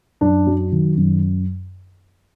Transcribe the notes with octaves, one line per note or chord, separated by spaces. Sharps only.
F#2 D4
F#3
D#3
F#2